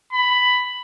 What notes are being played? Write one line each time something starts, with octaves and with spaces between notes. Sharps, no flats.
B5